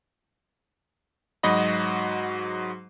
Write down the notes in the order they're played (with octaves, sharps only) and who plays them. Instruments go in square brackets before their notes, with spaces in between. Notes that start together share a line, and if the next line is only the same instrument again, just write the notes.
[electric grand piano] G#2 F#3 F#4 D#5 B5